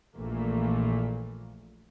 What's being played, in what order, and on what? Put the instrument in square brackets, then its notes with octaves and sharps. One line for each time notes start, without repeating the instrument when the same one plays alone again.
[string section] A#1 A#2 E3 A3 A#3